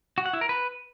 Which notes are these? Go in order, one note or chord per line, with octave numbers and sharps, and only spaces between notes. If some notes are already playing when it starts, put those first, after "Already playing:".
F#4
F#5
E4
A#4
B4